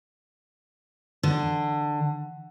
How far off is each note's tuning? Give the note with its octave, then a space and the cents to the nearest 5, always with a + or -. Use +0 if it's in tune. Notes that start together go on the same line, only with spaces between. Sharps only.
D3 +15